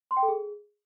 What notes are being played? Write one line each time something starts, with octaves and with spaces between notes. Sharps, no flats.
C6
G5
A4
G#4